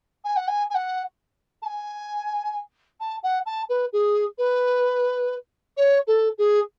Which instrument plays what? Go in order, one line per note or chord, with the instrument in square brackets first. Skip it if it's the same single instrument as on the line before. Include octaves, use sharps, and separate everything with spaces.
[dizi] G#5
F#5
G#5
G#5
F#5
A5
G#5
A5
F#5
A5
B4
G#4
B4
C#5
A4
G#4